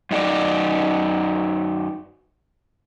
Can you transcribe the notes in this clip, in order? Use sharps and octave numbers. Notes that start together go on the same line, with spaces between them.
F#2 D#4 F#4 D5